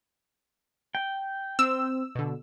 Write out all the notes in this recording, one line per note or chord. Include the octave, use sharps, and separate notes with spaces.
G5
C4 E6
B2 D3